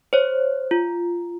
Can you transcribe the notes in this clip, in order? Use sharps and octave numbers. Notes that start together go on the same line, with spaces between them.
C5 C#5
F4